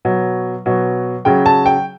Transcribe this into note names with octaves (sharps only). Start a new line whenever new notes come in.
B2 F#3
B2 F#3
C#3 F#3 G5
A5
G5